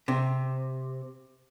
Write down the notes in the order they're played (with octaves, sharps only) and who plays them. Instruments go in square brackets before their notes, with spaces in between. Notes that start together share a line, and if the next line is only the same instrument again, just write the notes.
[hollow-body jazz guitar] C3